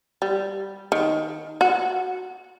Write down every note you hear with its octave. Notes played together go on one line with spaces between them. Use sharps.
G3
D#3
F#4